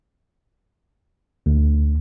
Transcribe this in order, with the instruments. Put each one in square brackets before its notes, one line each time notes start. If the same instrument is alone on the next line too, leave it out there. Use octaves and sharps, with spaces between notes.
[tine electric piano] D2